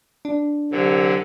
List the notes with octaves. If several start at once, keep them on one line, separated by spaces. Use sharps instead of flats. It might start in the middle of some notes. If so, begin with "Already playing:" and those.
D4
C2 D3 F#3